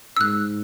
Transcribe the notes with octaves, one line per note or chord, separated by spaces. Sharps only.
E6
G#2 F#6